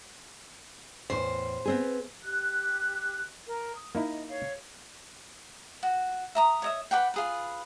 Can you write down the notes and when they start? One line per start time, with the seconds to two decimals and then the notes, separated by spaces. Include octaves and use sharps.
1.10 E2 A2 C5
1.66 B3 C4 G#4
2.22 G4 F#6
3.47 A#4
3.76 D#6
3.95 A#3 D#4 E4 D#5
4.29 C#5 F5
5.83 F#4
6.35 E5 A#5 D#6
6.62 C#5 D#5 E5
6.91 B4 D5 F#5 G5
7.14 F4 G#4 B4